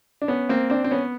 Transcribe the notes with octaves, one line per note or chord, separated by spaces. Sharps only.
D4
B3 C#4
A#3 C4
C4 D4
C4
B3 C#4